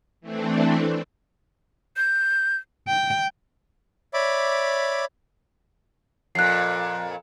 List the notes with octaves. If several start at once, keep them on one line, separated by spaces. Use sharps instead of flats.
E3 A3 C4 D4
G6
G5
C#5 D5 E5 B5 D6
F2 A#2 F#6 C7